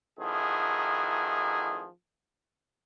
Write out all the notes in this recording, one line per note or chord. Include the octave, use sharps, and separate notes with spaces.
A1 D#3 F3 E4 F#4 G#4